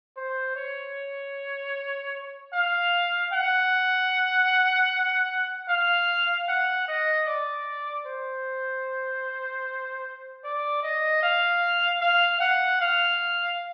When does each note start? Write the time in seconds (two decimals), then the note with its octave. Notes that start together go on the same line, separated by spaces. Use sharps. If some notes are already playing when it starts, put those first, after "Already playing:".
0.16 C5
0.56 C#5
2.53 F5
3.33 F#5
5.69 F5
6.48 F#5
6.88 D#5
7.27 D5
8.06 C5
10.44 D5
10.83 D#5
11.23 F5
12.01 F5
12.41 F#5
12.81 F5